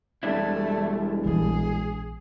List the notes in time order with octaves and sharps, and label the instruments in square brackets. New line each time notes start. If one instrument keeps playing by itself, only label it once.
[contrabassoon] E1 [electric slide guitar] G3 D4 E4 [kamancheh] A3
[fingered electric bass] A#1 E3 F#3 [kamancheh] G#4